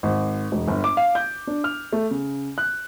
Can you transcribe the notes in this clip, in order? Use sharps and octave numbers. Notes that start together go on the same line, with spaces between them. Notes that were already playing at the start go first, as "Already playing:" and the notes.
G#1
E1
G1
D6
F5
G6
D4
F6
A3
C#3
F#6